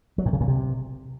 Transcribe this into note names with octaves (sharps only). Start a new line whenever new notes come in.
F#3
A2
C#3
A#2
C3